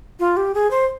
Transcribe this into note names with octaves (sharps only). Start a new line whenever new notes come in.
F4
G4
G#4
C5